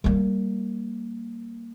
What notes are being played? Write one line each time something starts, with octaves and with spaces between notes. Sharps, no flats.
G3 A#3